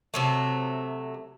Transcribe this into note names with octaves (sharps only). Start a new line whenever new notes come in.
C3 F#3 A3